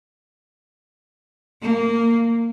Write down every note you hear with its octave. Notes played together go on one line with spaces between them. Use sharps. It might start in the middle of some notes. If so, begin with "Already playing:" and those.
A#3